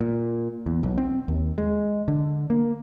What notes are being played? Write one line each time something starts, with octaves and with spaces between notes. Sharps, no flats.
A#2
E2
B1
C4
D#2
G#3
D3
A#3